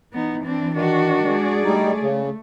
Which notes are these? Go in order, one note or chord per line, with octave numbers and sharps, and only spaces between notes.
E3 B3 D#4
C4 D4
D#3 D4 F#4
G#3 G#4 D5
G3 A3 D#4
C#3